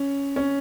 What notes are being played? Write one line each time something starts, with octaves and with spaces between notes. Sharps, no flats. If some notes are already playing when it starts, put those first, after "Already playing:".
Already playing: C#4
C#4